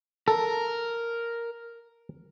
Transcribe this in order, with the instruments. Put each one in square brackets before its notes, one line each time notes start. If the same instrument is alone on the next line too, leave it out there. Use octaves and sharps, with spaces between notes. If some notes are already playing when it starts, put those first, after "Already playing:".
[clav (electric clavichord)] A4 [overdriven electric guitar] A#4